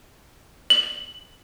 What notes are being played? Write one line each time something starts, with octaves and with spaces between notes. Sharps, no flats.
F#7